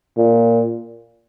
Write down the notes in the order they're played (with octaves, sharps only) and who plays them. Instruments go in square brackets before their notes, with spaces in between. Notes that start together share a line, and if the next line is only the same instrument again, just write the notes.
[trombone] A#2